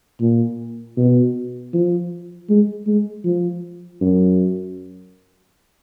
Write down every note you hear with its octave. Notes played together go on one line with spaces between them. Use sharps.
A#2
B2
F3
G#3
G#3
F3
F#2